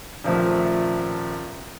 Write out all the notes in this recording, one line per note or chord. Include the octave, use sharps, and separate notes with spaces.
D#1 F3 A3 E5